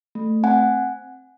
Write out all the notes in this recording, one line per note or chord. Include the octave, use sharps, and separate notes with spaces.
A3
C4 F#5 G#5